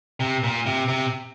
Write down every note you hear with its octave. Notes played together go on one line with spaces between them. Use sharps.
C3
A#2
C3
C3